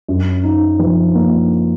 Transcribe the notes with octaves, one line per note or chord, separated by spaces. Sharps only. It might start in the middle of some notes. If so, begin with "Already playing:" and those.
F#2
D#4
F3
A#3